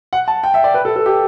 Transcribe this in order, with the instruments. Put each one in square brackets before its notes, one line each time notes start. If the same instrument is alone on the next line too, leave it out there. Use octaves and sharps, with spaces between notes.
[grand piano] F#5
A5
G5
E5
D5
B4
A4
A4
G4